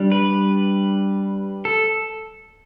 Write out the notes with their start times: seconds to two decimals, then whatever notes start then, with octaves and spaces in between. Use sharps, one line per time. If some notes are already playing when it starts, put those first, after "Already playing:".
Already playing: G3 D4
0.12 B4
1.65 A4